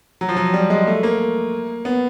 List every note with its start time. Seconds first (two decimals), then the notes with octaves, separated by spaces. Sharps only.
0.21 F#3
0.29 F3
0.37 F#3
0.54 G3
0.70 G#3
0.87 A3
1.03 A#3
1.85 B3